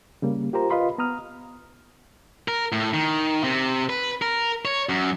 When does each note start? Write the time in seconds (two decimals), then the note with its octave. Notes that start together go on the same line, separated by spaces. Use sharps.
0.22 C#3 G3 A#3
0.53 F4 G4 A#4 C5 A#5
0.70 F4 B4 D#5 F5 B5 C6
0.98 B3 A#5 D#6 F6
2.48 A#4
2.72 A2
2.94 D#3
3.44 C3
3.90 B4
4.22 A#4
4.65 C#5
4.89 F#2